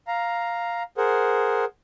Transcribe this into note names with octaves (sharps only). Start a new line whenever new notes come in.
F5 A#5
G#4 A#4 C5 F#5